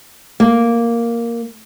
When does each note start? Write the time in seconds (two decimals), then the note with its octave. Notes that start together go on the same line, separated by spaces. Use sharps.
0.40 A#3